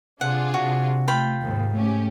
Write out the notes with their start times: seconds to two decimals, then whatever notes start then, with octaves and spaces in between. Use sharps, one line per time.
0.21 C3 D4 F4 G#4 F#5
0.54 C3 F#4
1.08 A3 F4 G5 B5
1.43 D#2 G#2
1.74 A3 C#4 G4